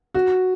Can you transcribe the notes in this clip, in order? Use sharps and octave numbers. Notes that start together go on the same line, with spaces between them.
F#4